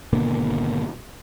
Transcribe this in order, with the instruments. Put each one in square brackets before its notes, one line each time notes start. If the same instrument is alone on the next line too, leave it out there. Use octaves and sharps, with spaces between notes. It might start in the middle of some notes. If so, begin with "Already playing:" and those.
[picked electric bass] G#1 B2 D3 A#3